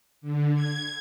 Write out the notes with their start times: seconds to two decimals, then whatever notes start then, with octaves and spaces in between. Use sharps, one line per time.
0.21 D3
0.54 G#6